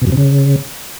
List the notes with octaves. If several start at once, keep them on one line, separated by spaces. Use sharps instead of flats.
B2
F#2
C3
C#3